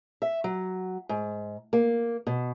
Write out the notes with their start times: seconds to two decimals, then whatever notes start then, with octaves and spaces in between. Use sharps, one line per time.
0.22 E5
0.44 F#3
1.09 G#2
1.73 A#3
2.27 B2